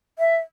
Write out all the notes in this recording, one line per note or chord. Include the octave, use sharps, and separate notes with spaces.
E5